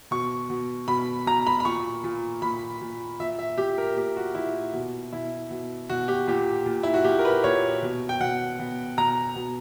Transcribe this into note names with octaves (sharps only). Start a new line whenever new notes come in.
B2 C#6
B2
B2 B5
B2 A#5
B5
B5
A#2 C#6
A#2
A#2 B5
A#2
A#2 E5
E5
A#2 G4
A#4
A#2 G4
F#4
A#2 E4
B2
B2 E4
B2
B2 F#4
G4
A#2 G4
A#2
E4
F#4
A#2 G4
A#4
B4
A#2 C#5
B2
G5
B2 F#5
B2
B2 A#5
B2